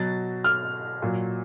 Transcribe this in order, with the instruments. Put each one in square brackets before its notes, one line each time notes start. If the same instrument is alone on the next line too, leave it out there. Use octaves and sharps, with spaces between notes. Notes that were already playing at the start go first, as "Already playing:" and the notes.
Already playing: [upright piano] B2 F#3 A6
F6
A#2 F#3